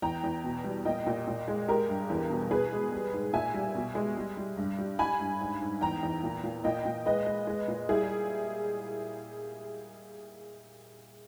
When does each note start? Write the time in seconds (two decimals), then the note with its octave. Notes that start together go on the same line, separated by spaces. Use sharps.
0.02 E2 G5 A#5
0.23 E2
0.44 B2
0.64 G3
0.85 A#2 D#5 G5
1.06 A#2
1.27 A#2
1.48 G#3
1.68 G#3 G4 A#4
1.89 G2
2.10 E2
2.30 B2
2.51 B2 G#4 B4
2.72 G#3
2.92 G3
3.13 G#2
3.33 A#2 E5 G#5
3.54 G3
3.75 B2
3.95 G#3
4.16 G3
4.37 G3
4.57 G2
4.78 G3
4.99 G3 G#5 B5
5.20 G2
5.40 G#2
5.61 G#2
5.81 E2 G5 A#5
6.03 E2
6.23 A#2
6.43 A#2
6.64 A#2 D#5 G5
6.85 A#2
7.06 G#3 B4 D#5
7.26 G#3
7.47 G#3
7.68 A#2
7.89 G3 E4 G#4